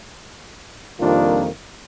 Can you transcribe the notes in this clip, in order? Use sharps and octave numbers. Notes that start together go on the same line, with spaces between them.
F2 C3 D#3 G3 A#3 D4 F4